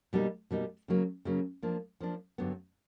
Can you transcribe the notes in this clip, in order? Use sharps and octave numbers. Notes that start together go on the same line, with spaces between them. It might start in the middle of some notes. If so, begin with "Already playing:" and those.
B2 G3 A#3 D#4
B2 G3 A#3 D#4
C#3 F#3 A#3
C#3 F#3 A#3
F3 A#3 D4
F3 A#3 D4
G2 D3 F#3 B3